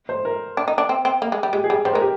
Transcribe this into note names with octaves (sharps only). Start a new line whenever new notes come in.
C5
A#4
D4
D#4
D4
C4
C4
A#3
G#3
G3
G#3 G4
G#4
G3
G3 C5
G#3 A#4
G4